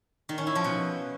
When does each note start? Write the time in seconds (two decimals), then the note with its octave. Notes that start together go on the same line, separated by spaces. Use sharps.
0.29 D#3
0.38 C#4
0.47 E4
0.55 F3
0.64 B2